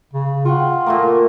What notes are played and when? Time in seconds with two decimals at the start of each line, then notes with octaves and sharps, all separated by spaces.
0.13 C#3
0.45 F4 F#5 G5 C#6
0.86 A#2 A3 A#3